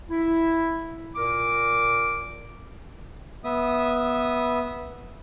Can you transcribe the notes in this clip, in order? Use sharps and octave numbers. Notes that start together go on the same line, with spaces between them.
E4
A#2 A#4 D6
B3 E5 D#6